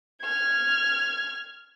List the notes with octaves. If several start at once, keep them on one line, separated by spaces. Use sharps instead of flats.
F6 G#6